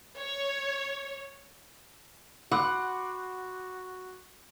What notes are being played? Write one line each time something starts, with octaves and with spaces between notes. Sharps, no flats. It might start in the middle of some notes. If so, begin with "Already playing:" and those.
C#5
F#4 F#5 B5 C6 D6 F#6